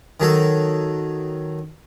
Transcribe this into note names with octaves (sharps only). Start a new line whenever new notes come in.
D#3 F#3 A4